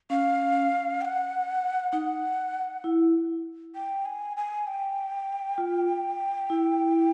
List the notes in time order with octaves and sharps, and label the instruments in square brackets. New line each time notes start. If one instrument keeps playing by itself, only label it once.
[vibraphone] C#4 [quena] F5
[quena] G5
F#5
[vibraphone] D#4 [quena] F#5
[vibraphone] E4
[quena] G5
G#5
G#5
G5
[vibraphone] F4
E4